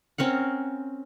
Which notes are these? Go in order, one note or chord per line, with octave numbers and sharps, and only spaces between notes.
C4 C#4 A#4 F#5